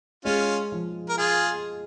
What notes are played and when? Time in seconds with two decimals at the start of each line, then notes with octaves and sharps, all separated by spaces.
0.25 G#3 C#4 F4
0.72 F3
1.09 A#4
1.18 F4 G#4